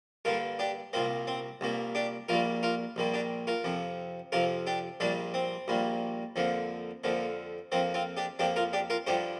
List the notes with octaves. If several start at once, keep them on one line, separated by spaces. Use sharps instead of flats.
G2 D3 A#3 F4 A#4
D4 G4
C2 A#2 A#3 C4
C4
C2 A#2 A#3
D4 G4
A#1 A#2 G3 A#3 F4 A#4
F4 A#4
A#1 A#2 G3 A#3
D4 G4
F4 A#4
F2 C3 F3
F2 C3 F3 F4 A#4
D4 G4
A#1 A#2 G3 A#3 D4
C4
A#1 A#2 G3 A#3
F2 D3 F3 A#3
F2 D3 F3 A#3
F2 F3 A#3 C4
C4 F4
D4 G4
F2 F3 A#3 D4 G4
F4 A#4
D4 G4
F4 A#4
G2 D3 F3 G4 C5